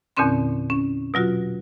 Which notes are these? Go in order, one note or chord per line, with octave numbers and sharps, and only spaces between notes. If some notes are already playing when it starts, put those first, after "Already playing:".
E2 A#2 D3 C4 C#4 C6
C#4
B2 F#3 F4 F#4